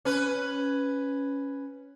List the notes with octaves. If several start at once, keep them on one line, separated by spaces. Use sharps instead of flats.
C#4 B4